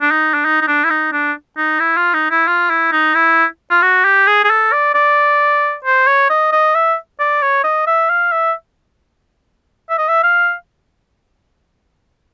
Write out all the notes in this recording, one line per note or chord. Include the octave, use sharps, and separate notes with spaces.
D4
D#4
D4
D#4
D#4
D4
E4
D#4
D4
D#4
E4
F4
D#4
E4
F4
E4
D#4
E4
F4
F#4
G4
G#4
G#4
A4
D5
D5
C5
C#5
D#5
D#5
E5
D5
C#5
D#5
E5
F5
E5
E5
D#5
E5
F5